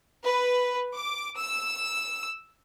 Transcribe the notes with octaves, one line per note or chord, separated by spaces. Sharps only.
B4
D6
E6